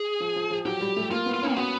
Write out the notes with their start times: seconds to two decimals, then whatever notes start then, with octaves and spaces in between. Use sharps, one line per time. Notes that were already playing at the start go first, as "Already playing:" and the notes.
Already playing: G#4
0.20 F3
0.36 F3
0.51 F3
0.65 F#3 G4
0.81 G3
0.96 A3
1.11 A#3 F4
1.26 B3
1.34 F4
1.42 C#4
1.51 A#3
1.57 B3 F#4